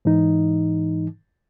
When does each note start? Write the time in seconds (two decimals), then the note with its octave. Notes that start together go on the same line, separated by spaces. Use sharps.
0.05 G#2 E3 D#4